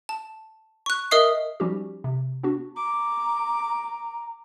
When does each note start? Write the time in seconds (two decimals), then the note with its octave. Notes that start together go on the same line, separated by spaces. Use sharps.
0.09 A5
0.86 C#6 F#6
1.11 A#4 D#5 E5 D#6 C7
1.60 F3 G3 C#4 D#4 F#4 G4
2.04 C3
2.43 B3 D4 F#4
2.76 A#5 D6